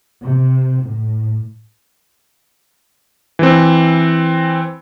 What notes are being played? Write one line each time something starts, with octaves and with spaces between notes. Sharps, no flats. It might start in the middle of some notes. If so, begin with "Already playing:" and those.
C3
A2
E3 C4